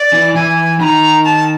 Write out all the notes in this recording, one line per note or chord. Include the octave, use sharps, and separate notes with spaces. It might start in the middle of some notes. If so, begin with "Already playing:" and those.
Already playing: D5
E3 E4
E3 E4 G#5
D#3 D#4 A#5 B5
A5